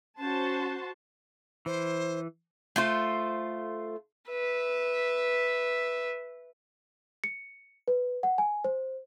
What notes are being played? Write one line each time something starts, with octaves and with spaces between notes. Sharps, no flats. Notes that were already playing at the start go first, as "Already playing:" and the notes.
C#4 F#4 C5 A5
E3 C5
A3 F4 C5
B4 E5
C#7
B4
F#5
G#5
C5